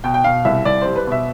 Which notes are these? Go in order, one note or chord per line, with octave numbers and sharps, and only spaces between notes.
B2 G5
G5
B2 F5
C2 E5
C2 D5
G3 C5
B4
B2 E5